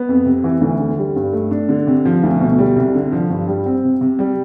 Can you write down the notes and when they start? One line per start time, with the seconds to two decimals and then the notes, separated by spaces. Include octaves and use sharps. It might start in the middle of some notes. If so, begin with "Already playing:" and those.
Already playing: B3
0.09 F2
0.25 C3
0.44 E3
0.61 D2
0.80 D3
0.98 G3
1.16 G2
1.33 A3
1.51 D4
1.69 D3
1.87 C3
2.05 F3
2.23 D2
2.41 B2
2.59 G3
2.76 C2
2.95 D3
3.12 F3
3.30 G2
3.48 G3
3.66 C4
3.84 C3
4.01 C3
4.19 G3